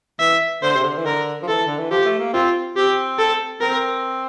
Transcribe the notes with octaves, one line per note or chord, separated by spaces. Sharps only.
E3 E5
D3 C5
C3
D3
E3
D3 A#4
F3
E3 A4
D3
E3
F3 G4
A3
A#3
C4 F4
C4 G4
A4
C4 A#4